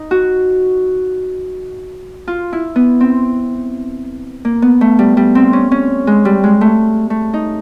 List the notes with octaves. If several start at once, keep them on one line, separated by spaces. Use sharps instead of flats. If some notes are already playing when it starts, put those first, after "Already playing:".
Already playing: D#4
F#4
F4
E4
B3
C4
A#3
B3
A3
G3
G3
C4
C#4
C#4
G#3
G3
G#3
A3
A3
D#4